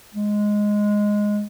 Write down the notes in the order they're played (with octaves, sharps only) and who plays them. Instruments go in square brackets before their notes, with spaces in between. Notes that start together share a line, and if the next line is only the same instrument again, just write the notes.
[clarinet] G#3